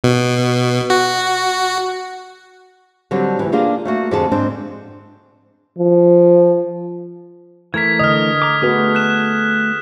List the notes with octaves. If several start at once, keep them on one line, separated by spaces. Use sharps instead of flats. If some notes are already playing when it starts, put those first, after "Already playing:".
B2
F#4
D3 F#3 G3 C4 D4
D2 E3
A#3 D4 F4 G#4 D5 F5
A3 A#3 F#4
F2 D3 D4 G#4 A5
G#2 C4 D4
F3
E3 A3 A#4 G#6 B6
D3 D#5 D#6 F6
A#5 D6
A3 B3 F#4 G#4 B4
F#6 E7